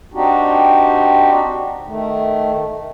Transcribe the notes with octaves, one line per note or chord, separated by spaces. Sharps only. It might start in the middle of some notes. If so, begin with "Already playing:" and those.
C4 D4 D#4 F#4 G4
D#3 A3